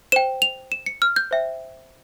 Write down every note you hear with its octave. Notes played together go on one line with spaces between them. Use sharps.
C5 G5 E7
F7
E7
C#7
F6
G6
C5 E5 G5